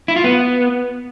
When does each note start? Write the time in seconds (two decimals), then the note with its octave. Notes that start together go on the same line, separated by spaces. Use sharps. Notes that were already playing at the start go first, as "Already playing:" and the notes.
0.08 E4
0.16 F4
0.24 B3